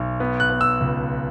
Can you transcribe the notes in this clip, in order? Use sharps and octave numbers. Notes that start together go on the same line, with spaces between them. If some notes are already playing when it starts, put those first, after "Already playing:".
Already playing: B1
B3
F#6
B3
E6
C#2